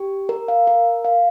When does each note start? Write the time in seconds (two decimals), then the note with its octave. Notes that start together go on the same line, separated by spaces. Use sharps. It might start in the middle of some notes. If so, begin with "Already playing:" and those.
Already playing: G4
0.29 A#4
0.48 F5
0.67 A#4
1.05 F5